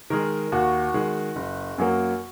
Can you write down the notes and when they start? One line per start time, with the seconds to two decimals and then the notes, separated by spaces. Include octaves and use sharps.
0.10 D#3 G#3 A#4
0.52 D#2 F#4
0.94 D#3 G#3
1.36 F#1
1.78 F#2 F#3 A#3